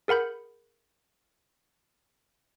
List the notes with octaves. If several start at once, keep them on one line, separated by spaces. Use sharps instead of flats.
G#4 A#4 F#5 B5 G6